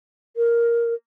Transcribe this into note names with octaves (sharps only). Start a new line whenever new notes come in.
A#4